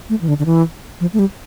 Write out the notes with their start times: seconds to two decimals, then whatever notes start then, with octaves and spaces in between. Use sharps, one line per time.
0.09 A3
0.21 E3
0.28 D3
0.39 D3
0.46 E3
1.01 F3
1.13 A3
1.19 G3